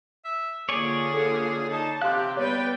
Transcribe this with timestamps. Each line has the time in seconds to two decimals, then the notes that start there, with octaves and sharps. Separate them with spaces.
0.25 E5
0.69 D3 A#3 F4 G#4 C#5 D5 G#5
1.14 A4
1.70 D#4 A5
2.02 C3 G4 F5 C6 F#6
2.37 G3 B3 B4 C#5 G5